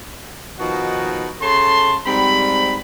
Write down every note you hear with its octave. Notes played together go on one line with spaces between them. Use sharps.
B2 D#3 F3 D#4 F#4
C#3 A4 A5 C6
G#2 G3 C4 B5